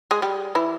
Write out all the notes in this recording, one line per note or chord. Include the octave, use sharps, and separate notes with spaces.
G#3 G#4
G3 G4
E3 E4